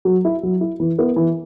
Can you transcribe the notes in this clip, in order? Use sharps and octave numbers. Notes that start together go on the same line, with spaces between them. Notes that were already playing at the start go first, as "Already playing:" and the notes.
F#3
E4
F#3
E4
E3
B3 E4
E3